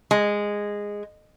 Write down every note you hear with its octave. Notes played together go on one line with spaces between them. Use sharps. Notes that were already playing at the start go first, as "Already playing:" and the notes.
G#3